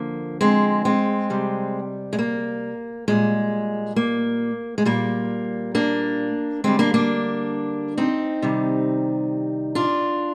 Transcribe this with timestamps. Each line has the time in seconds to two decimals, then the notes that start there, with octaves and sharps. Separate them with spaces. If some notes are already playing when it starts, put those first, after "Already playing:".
Already playing: D3 F3 A#3
0.41 G#3 C4
0.85 G#3 C4
1.30 C3 G3
2.13 G#3
2.19 A#3
3.08 A#2 G3 G#3
3.96 A#3
4.78 G#3
4.85 A#2 G3 A#3
5.75 A#3 D4
6.64 D3 G3 G#3 C4
6.79 A#3 D4
6.94 A#3 D4
7.98 C4 D#4
8.42 C3 D#3 G3
9.75 D4 F4